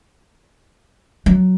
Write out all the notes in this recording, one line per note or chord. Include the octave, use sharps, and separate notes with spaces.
F#3